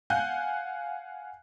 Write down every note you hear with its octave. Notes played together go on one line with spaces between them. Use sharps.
F5 F#5 G#5 F#6 G6